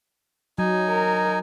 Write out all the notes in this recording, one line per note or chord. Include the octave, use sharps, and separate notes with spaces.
F#3 D#4 G#5
A#4